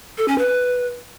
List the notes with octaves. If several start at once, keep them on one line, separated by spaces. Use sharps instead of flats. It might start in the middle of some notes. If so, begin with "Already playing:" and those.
A4
C#4
B4